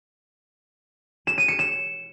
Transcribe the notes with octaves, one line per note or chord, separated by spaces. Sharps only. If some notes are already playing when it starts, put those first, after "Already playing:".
E7
D#7
C#7
E7